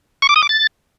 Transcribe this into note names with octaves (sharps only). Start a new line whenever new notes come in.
C#6
D6
D#6
D6
A6